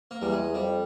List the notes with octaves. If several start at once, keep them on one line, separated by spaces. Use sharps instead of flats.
A#3
E2 G3
G#3
F2 G3